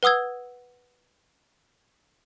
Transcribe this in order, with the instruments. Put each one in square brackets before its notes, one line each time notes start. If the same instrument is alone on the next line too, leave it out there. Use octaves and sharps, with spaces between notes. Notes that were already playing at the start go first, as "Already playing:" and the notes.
[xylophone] B4 F#5 D#6 E6 G#6